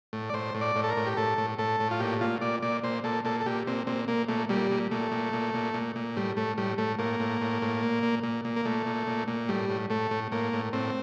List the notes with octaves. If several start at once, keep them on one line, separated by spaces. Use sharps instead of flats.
A2
D5
A2 C5
A2
D5
A2
A4
A#4
A2
G4
A2 A4
A2
A2 A4
A2
F4
A#2 G4
A#2 F4
A#2 D5
A#2 D5
A#2 C5
A#2 A4
A#2 A4
A4
A#2 G4
A#2 C4
A#2 C4
A#2 A#3
A#2 A3
A#2 G3
A#2
A#2 A3
A#2
A#2
A#2
A#2
A#2
A2 G3
A2 A3
A2 G3
A2 A3
A2 A#3
A2
A2
A2
A#2
A#2
A#2
A#2
A#3
A#2 A3
A#2
A#2
A#2
A2 G3
A2
A2 A3
A2
A2 A#3
A2
A2 C4